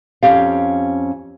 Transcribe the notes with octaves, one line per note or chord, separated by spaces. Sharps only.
F2 C#3 C#4 G4 F5